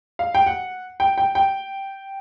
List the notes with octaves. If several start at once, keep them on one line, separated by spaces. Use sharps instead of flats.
F5
G5
F#5
G5
G5
G5